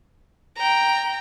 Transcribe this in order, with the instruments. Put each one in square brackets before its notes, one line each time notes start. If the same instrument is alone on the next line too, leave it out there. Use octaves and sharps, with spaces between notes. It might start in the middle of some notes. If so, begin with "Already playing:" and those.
[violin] G5 A#5